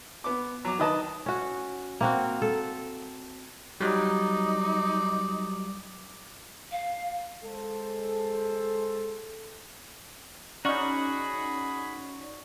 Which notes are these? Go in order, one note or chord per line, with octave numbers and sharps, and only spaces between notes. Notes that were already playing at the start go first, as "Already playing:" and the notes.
B3 D6
F#3 D6
D#3 B4 D#5 A5
C#4 F#4
A#3 C4 F#4
A4
F#3 G3 D#4 D5
F5
G#3 A4 C5
C#4 D#4 F#4 G#4 D5 F#5 B5 C#6